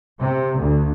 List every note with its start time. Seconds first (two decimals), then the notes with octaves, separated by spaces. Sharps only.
0.20 C3
0.59 D2